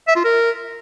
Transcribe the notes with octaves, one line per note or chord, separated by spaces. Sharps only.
E5
F4
A#4